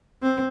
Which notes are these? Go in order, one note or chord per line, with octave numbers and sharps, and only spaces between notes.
C4